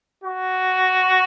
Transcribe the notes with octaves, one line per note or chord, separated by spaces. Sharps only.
F#4